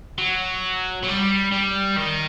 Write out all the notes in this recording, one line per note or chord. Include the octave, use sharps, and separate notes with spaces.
F#3
F#3
G3
G3
D#3